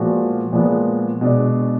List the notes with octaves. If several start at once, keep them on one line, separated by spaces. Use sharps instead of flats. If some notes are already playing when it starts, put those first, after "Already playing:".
Already playing: A#2 F3 G#3 B3 F#4
A#2 F3 G#3 B3
B2 G#3 D4